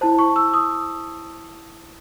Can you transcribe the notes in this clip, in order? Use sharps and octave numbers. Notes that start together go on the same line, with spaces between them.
E4 C5 A5
C#6
E6
D#6